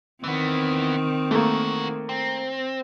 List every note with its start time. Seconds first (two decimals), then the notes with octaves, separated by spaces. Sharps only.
0.24 D#3 E3 B3 C4
1.31 E3 A3 A#3 F#4
2.09 C4